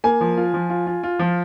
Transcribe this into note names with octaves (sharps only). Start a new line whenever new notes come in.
A#3 G#5
F3
F4
F3
F4
F4
F4
F3